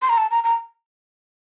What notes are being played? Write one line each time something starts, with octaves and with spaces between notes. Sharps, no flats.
C6
A#5
A5
A#5
A#5